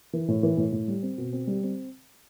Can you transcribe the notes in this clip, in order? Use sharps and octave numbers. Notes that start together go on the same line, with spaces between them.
E3
A2
E3
A2
A2
G3
C4
B2
C4
G3
C4